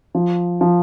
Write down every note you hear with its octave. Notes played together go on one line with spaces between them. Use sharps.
F3
F3